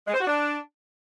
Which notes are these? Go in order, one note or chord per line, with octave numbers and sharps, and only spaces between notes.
G#3
C5
F#4
D4